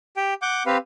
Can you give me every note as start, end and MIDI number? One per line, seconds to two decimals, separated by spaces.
0.17 0.34 67
0.17 0.34 79
0.42 0.63 78
0.42 0.63 86
0.42 0.63 91
0.66 0.77 60
0.66 0.77 67
0.66 0.77 71
0.66 0.77 77